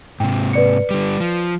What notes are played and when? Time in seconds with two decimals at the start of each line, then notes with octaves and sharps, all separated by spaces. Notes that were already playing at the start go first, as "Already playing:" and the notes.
0.20 G#2 C3 G5
0.53 B4 D5 C#7
0.91 D3 G3
1.20 F3